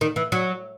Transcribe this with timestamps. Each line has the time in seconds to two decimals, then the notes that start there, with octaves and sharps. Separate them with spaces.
0.01 D#3
0.16 E3
0.32 F#3